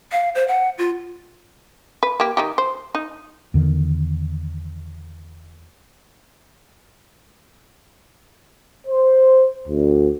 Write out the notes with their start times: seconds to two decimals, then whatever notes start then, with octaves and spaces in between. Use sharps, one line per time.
0.12 F5
0.35 C5
0.48 F#5
0.78 F4
2.03 B4
2.20 A#3 G4
2.37 D#3 D#4 G4
2.58 C5
2.95 D#4
3.54 E2 D3 D#3
8.87 C5
9.68 D2